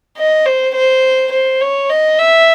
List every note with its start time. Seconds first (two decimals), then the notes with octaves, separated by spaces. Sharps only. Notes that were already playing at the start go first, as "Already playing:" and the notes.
0.18 D#5
0.46 C5
0.75 C5
1.32 C5
1.62 C#5
1.90 D#5
2.19 E5